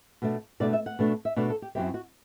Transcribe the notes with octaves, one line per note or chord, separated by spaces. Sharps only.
B2 A3 D4
B2 A3 D4 D5
E5
F#5
B2 A3 D4
E5
B2 A3 D4 D5
A4
G4
F#2 F#3 C4 E4 G4
F#4